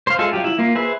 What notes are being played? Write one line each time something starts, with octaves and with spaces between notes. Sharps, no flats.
C5 F5
G#3 F4 G#4 A4 E5
F#3 F4 G4
E4
A#3 F4
G#4 B4 C5 E5